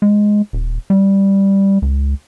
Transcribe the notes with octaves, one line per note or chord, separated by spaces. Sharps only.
G#3
D#1
G3
C#2